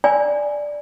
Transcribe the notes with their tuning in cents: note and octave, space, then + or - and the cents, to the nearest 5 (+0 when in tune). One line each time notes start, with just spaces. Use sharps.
D5 +0 G#5 +0